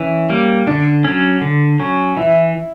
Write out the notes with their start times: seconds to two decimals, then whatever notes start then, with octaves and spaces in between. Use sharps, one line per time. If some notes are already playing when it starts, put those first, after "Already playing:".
Already playing: E3 C#4
0.30 G3 A#3
0.66 D3 D4
1.04 F#3 C#4
1.42 D3
1.80 F#3 C#4
2.17 E3 E4